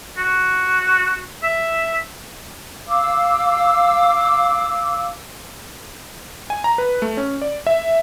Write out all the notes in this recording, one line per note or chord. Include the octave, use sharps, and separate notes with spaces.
F#4
E5
F5 D6 E6
G#5
A#5
B4
A3
C#4
D5
E5